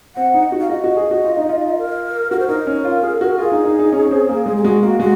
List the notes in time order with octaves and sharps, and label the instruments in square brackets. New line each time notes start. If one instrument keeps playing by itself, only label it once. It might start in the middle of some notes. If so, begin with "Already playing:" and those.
[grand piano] C4 [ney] F#5
[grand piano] D#4
F#4
[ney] F5
[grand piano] F#4 [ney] D#5
[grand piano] F#4
G#4
F#4
F4
D#4
F4
[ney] A#4
[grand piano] F#4 [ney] A#4
[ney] C5
[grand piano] D#4 [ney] A#4
[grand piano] C#4
F4
G#4
F#4
[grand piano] F4 [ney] G#4
[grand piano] D#4
D#4
D#4
C#4
C#4
C4
A#3
[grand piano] G#3 [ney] G#4
[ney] G#4
[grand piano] G#3 [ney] F#4
[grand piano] A#3 [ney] F#4
[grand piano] G#3 [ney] F#4